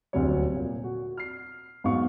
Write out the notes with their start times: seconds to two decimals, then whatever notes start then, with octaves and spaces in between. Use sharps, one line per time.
0.13 D#1 D2 C3 F#3 C#5
0.56 A#2
0.84 F#4
1.17 F6 C7
1.84 G#2 F#3 B3 D#4 F5 C#6